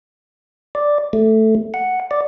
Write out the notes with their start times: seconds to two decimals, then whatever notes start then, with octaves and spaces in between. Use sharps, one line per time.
0.75 D5
1.13 A3
1.74 F#5
2.11 D5